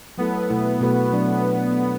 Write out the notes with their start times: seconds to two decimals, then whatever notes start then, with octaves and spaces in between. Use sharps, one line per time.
0.18 F#3 A3 B3 E4 A4
0.50 B2 A3 E4
0.81 B2 A3 F#4 B4
1.12 F#3 D4 B4